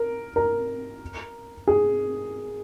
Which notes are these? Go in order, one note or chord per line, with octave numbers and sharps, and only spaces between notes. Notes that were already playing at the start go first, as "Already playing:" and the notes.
Already playing: A#4
A#4
G#4